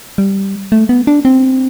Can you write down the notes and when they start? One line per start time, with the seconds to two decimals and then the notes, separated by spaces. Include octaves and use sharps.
0.18 G3
0.72 A3
0.89 B3
1.07 D4
1.25 C4